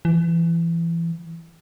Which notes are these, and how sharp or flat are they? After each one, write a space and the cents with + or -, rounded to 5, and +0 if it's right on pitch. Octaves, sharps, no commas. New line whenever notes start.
E3 +25